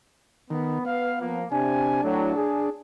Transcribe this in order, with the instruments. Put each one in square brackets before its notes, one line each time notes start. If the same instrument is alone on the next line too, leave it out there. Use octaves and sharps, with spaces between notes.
[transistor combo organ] D#3 [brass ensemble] B3
[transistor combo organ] B3 [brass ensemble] B4 F5
[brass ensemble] F3 A#3
[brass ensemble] C3 G#5 [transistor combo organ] D4
[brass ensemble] A2 F#3
G#4